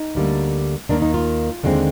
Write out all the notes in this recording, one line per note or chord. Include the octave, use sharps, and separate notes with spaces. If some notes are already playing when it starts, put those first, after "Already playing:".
Already playing: D#4
D2 D3 G3 A#3
D#2 D#3 A#3 D4
D#4
F4
D#2 D3 G#3 C4